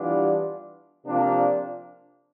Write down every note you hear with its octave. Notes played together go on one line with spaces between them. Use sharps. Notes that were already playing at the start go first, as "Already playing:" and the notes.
Already playing: E3 G3 B3 D4 F4
C3 F3 A#3 D4 F4